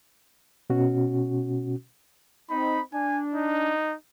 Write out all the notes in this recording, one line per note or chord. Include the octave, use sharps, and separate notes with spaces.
B2 C#4 F#4
C4 D#4 B5
D4 G#5
D#4